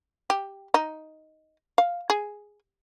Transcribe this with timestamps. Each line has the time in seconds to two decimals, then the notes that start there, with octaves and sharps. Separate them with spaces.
0.30 G4
0.74 D#4
1.78 F5
2.10 G#4